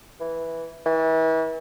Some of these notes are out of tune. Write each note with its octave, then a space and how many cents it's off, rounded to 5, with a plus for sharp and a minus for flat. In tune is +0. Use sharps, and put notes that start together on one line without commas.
E3 -5
E3 -35